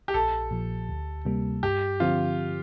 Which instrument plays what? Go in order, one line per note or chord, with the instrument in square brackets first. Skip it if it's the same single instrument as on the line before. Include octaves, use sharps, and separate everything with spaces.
[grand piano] G4
[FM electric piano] A#1 [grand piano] A4
[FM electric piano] A#2 F3
D2
C3 G3 A#3
[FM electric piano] G2 [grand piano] G4
[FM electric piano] D3 F3 C4 [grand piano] F4